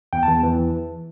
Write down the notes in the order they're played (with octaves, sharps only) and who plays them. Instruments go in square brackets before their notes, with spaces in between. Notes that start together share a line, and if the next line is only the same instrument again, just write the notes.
[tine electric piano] E2 G5
E2 A5
E3